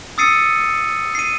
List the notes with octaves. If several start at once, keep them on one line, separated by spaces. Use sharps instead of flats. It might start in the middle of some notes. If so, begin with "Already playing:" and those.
D#6 E6 A6 C7 C#7 D#7
C7 D#7